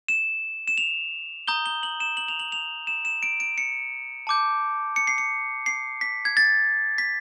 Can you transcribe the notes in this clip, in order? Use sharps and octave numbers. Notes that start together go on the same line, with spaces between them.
E7
E7
F7
A#5 D#6 G6 G7
G7
F#7
E7
F#7
F7
F#7
F7
E7
E7
D7
D7
C#7
A5 D6 G6
C#7
C7
C#7
C7
B6
G#6
A6
B6